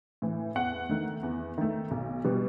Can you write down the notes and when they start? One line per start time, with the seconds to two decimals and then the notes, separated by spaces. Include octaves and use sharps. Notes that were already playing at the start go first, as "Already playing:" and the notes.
0.22 A2 E3
0.55 E2 F#5
0.89 D#3 A3
1.23 E2
1.58 D#3 A3
1.91 B1
2.24 B2 G3 B3